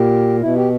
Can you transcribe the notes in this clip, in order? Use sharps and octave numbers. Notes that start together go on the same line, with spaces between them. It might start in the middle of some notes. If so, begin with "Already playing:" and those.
Already playing: A#2 G4
B2 E4
G4